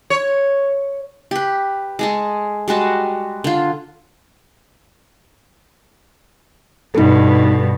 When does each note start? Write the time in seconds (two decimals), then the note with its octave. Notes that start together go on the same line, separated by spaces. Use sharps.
0.10 C#5
1.31 G4 B4
1.99 G#3 G#4 A4
2.68 G3 G#3 F#4 A5
3.44 D3 F4
6.95 G2 B2 D#4 A4